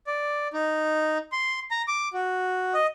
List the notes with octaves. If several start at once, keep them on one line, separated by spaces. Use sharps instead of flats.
D5
D#4
C6
A#5
D6
F#4
D#5